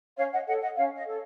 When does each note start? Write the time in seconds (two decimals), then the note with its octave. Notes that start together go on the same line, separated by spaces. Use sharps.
0.17 C#4 C#5 F5
0.32 D#5 F#5
0.47 A4 C#5 D#5 F#5
0.61 D#5 F#5
0.76 C#4 C#5 F5
0.96 D#5
1.06 A4 C#5